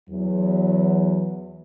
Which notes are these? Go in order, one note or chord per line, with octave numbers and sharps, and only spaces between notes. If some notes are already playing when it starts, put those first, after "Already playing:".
E2 F#3